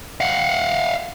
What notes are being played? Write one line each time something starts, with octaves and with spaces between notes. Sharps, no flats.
F5 F#5